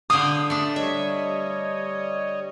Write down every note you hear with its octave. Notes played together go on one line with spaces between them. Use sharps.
D3 G4 F5 D#6
A3 D4
G3 C#5 D#5 E5